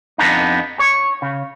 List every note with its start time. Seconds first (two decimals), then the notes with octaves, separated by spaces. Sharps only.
0.18 F2 C3 B3 D4 D#4
0.79 C#5
1.22 C#3